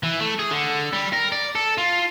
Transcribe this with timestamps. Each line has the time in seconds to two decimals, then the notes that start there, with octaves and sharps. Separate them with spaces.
0.03 E3
0.20 A3
0.39 G#4
0.51 D3
0.93 G3
1.13 A#4
1.32 D5
1.55 A4
1.78 F4